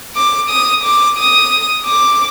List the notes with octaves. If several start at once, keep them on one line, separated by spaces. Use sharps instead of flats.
D6
D#6
D6
D#6
D6